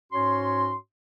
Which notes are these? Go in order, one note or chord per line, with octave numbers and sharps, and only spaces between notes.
G#2 C#4 F#4 C#5 C6